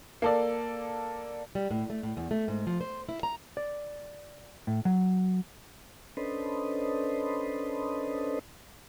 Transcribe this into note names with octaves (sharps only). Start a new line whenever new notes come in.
A#3 A4 D5
G3
A2
A3
A2
E2
A3
G#2
F3
C5
E4
A#5
D5
A2
F#3
C#4 D4 A4 B4 C5 D#5